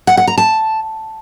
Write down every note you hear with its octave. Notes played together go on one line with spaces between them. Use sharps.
F#5
F#5
A#5
A5